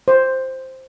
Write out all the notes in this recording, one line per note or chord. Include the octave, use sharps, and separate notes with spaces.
C5